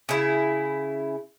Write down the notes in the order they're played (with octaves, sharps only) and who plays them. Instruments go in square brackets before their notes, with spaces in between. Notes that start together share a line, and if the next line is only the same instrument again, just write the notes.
[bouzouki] C#3 E4